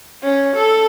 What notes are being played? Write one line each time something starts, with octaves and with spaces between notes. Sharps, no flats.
C#4
A4